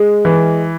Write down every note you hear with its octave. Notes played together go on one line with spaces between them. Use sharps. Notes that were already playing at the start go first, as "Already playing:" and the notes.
Already playing: G#3
E3